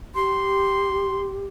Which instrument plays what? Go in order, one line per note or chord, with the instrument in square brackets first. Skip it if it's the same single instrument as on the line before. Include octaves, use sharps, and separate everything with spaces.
[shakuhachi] G4 [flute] C6